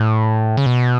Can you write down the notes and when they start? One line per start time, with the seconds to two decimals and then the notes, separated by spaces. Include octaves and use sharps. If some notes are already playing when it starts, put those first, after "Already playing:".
Already playing: A2
0.57 C#3
0.66 B2